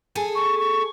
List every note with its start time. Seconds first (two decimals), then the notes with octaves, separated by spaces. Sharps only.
0.15 G#4 A4 G#5
0.35 C#6
0.59 C#6